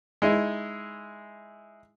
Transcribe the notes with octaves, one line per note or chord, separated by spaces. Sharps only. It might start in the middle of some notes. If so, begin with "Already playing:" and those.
G#3 D#4 E4